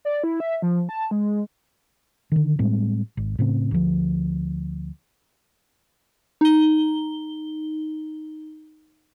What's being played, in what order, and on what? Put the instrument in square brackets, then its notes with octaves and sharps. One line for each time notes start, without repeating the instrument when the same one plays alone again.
[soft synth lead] D5
E4
E5
F3
A5
G#3
[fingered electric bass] D3 D#3
A2 G3 G#3 C4
G#1
A2 C#3 C4
D2 F3
[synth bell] D#4 G7